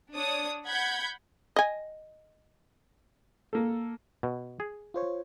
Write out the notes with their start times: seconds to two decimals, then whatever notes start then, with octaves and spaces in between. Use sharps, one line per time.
0.15 D4 C#5 D#6
0.66 F#5 B5 G6 G#6
1.56 D#5 G#5
3.53 A#3 A4
4.23 B2
4.60 G#4
4.94 F4 C5 C#5